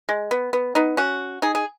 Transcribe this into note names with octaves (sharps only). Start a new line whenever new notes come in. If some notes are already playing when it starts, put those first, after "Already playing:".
G#3
B3
B3
B3 D#4
C#4 F#4
D#4 G#4
G#4